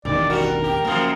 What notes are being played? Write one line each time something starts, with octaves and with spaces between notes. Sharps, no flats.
E1 A1 G2 D#3 D5
G3 F#4 A#4
G4
F#2 C#3 F3 A#3